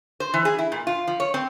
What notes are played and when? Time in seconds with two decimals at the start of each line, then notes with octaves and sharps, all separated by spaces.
0.20 C5
0.34 E3
0.45 G#4
0.59 E4
0.72 A#2
0.87 F4
1.07 F3
1.20 C#5
1.34 C4